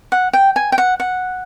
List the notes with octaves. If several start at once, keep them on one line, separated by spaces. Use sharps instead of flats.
F#5
G5
G#5
G5
F#5
F#5